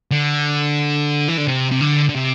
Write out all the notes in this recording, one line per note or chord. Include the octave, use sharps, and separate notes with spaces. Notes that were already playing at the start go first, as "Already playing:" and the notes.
D3
E3
D3
C3
C3
D3
D3
C3